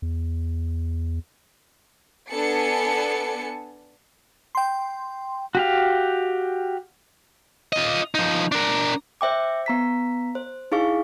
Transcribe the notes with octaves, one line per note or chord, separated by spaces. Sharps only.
E2
B3 D4 A4 G#5 A5 C#7
G5 C6
F#4 G4 F5
F4 D#5
F3 D#4
D4 A#4
C5 E5 G5 D6
B3 A#5 B6
C5
D#4 E4 G#4 F5 C#6